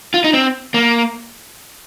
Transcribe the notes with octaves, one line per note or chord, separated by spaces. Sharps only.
F4
D#4
C4
A#3